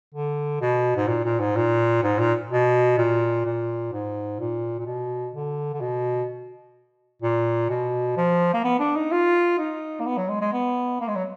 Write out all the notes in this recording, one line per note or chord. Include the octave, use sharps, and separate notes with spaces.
D3
B2
G#2
A#2
A#2
G#2
A#2
G#2
A#2
B2
A#2
A#2
G#2
A#2
A#2
B2
D3
D3
B2
A#2
B2
F3
A#3
B3
D4
D#4
F4
D#4
A#3
B3
F#3
G#3
G#3
B3
A#3
G#3
F#3